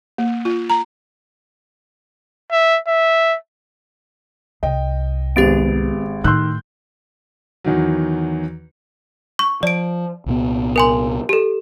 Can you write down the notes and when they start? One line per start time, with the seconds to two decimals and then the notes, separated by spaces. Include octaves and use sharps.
0.18 A#3
0.45 F4
0.70 A#5
2.51 E5
2.88 E5
4.63 C2 D#5 G5
5.36 G#1 G#2 B3 G4 G#4 A6 D7
6.24 A2 D#3 C6 E6 F#6 G6
7.64 E2 D#3 F#3
9.39 C#6
9.63 F3 D5 D7
10.26 C2 A#2 B3
10.76 A#4 G#5 C6
11.29 G4 A4